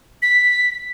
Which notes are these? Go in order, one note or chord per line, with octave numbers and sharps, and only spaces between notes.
B6